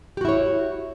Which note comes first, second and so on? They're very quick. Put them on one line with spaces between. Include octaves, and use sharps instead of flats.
G4 F#4 E4 C#5